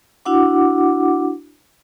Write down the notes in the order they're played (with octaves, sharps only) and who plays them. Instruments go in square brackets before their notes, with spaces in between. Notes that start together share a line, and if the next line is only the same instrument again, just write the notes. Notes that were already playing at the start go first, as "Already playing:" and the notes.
[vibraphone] D4 E4 F#4 F#5 D6